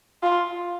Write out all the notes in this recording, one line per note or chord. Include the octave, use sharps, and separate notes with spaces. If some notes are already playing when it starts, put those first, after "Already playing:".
F4